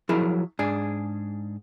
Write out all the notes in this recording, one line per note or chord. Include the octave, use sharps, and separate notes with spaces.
F3 F#3 E4 G#4 A#4
G#2 D4 G#4